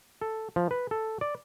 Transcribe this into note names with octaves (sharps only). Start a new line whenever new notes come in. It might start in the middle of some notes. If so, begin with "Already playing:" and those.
A4
F3
B4
A4
D5